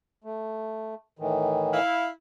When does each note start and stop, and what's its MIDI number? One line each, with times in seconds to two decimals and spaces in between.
0.24 0.95 57
1.19 1.80 45
1.19 1.80 51
1.19 1.80 52
1.74 2.10 64
1.74 2.10 77